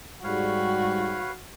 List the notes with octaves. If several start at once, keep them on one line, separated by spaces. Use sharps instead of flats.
G#2 G3 F#4 B4 C#5 F5